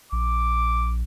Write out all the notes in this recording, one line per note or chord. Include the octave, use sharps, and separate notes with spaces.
A#1 D6